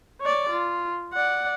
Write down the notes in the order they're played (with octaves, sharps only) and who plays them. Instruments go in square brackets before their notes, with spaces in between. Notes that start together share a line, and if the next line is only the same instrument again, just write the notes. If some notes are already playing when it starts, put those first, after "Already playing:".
[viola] C#5 D5
F4
D5 F#5